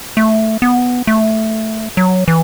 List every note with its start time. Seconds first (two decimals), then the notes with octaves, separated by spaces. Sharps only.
0.17 A3
0.62 B3
1.07 A3
1.97 F#3
2.28 E3